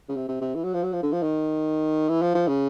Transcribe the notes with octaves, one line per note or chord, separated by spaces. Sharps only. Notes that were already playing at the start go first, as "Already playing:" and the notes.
C#3
C3
C3
C3
E3
F#3
F3
F#3
F3
D3
F3
D#3
E3
F3
F3
C#3